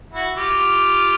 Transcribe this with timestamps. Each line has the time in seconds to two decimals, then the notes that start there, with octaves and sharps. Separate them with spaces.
0.13 E4 F#4
0.37 F4 G4